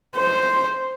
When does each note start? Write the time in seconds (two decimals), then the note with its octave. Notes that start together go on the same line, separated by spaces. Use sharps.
0.17 C5